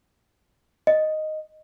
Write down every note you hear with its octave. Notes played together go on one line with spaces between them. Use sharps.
D#5